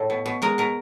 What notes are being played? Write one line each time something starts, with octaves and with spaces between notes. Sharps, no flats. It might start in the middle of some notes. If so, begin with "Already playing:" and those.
Already playing: A2 A3
B2
B2
G#3 A#4
B2 A#4